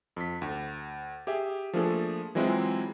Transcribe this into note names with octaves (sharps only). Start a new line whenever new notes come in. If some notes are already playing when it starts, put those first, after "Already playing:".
F2 B6
D2
G4 G#4 E5
F3 A3 A#3 D4 G#4 A4
E3 F#3 G#3 C4 E4 F4